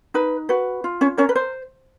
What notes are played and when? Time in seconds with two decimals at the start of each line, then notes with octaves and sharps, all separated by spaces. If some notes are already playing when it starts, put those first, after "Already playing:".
0.14 D#4 B4
0.49 F#4 B4
0.84 F4
1.01 C#4 C#5
1.17 C#4 A#4 C#5
1.29 B4
1.35 C5